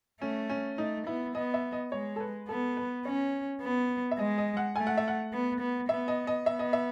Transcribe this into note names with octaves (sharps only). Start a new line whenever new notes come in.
A3 C#4
C#4
A3 D#4
B3 E4
B3 D#5
E5
D#5
G#3 C#5
A4
B4
B3 A4
B4
C#4 C#5
B3
E5
G#3 D#5
D#5
F#5
A3 G#5
F#5
E5
F#5
B3
B3
B3 E5
D#5
D#5
B3 E5
D#5
E5